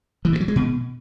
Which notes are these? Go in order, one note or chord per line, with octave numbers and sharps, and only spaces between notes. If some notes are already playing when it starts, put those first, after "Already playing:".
E3
G2
F#3
G#3
B2